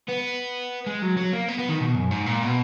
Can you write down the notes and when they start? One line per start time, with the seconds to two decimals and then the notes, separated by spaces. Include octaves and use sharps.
0.09 B3
0.87 G#3
1.02 F#3
1.17 F#3
1.33 A#3
1.48 B3
1.58 B3
1.69 D#3
1.80 B2
1.95 F#2
2.11 G#2
2.26 A#2
2.42 B2